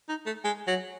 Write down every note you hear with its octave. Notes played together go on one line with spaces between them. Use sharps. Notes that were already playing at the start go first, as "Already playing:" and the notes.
D#4
A3
G#3
F#3